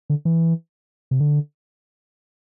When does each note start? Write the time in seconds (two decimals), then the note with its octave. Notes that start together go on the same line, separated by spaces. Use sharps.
0.10 D3
0.25 E3
1.11 C3
1.20 D3